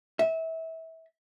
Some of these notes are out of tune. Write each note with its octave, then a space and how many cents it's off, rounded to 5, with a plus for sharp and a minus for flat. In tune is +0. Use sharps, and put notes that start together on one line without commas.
E5 -25